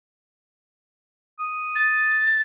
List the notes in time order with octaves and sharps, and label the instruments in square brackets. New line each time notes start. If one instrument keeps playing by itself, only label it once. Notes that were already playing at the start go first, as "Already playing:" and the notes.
[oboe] D#6
[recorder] A6